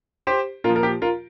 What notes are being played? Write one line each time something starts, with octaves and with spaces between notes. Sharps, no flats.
G4 C5
A#2 F4 A#4
F3
A#4
G4
F4 A#4